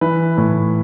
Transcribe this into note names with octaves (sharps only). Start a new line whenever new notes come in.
E3 B4
A2